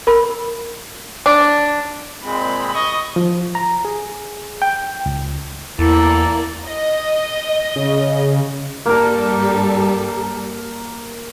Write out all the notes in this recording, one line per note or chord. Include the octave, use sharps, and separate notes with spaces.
A#4 B5
D4
A#2 G#3 C4 B5
D#5 C#6
F3
A#5
G#4
G5
C#2
E2 A#3 E4 A4 D5
D#5
C#3
G2 G3 A#3 A4 A#4